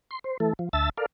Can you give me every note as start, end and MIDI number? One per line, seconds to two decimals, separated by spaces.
0.11 0.19 84
0.24 0.37 72
0.40 0.53 52
0.40 0.53 57
0.40 0.53 69
0.59 0.69 53
0.73 0.89 38
0.73 0.89 76
0.73 0.89 81
0.73 0.89 88
0.73 0.89 93
0.97 1.06 69
0.97 1.06 70
0.97 1.06 74
0.97 1.06 77